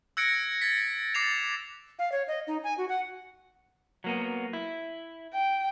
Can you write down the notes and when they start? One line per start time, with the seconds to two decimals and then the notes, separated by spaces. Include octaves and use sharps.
0.17 E6 F#6 G#6 A#6 C#7 D7
0.62 G#6 A6 B6
1.15 D6 A6 C7 E7 F7
1.99 F5
2.12 C#5
2.28 D#5
2.47 D#4
2.64 G#5
2.78 F#4
2.89 F#5
4.04 F#3 A#3 B3
4.53 E4
5.34 G5